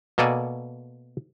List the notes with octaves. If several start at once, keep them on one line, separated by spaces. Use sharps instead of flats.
B2 A#3 A4 D5 G#5